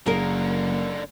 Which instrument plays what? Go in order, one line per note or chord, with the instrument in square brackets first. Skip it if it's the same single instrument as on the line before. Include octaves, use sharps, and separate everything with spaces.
[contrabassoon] F#1 [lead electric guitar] D3 A#3 [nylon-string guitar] G#4 A#4